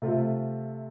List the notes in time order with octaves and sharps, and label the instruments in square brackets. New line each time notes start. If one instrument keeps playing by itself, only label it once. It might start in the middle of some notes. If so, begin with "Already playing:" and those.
[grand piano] C3 A3 F4